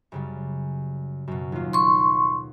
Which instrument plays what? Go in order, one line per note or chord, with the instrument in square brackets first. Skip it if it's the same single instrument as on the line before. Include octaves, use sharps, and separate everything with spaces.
[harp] F#2 C#3 G3
F#2 B2
D#2 F4
[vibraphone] C6 C#6